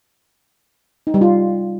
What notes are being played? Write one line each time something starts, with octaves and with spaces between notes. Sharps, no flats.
D#4
G3
F4